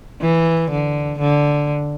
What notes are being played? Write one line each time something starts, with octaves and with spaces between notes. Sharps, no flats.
E3
D3
D3